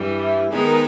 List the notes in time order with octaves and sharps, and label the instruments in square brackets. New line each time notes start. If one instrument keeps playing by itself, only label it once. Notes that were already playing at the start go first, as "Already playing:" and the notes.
Already playing: [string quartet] G2 E3 G3
[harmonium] E4
[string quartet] D#3 G#3 B3 D#4 [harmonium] G#4
[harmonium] A#4